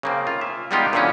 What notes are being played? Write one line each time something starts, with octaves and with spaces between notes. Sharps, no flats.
C#3 A#3 C4
F4
E5
G3 G#3 B3 D#4 F4 G4
A#2 D3 E3 A#3 B3 C#4